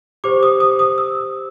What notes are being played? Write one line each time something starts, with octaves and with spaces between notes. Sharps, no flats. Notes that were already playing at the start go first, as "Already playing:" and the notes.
G4 C5 D6
D#6
D#6
D#6
E6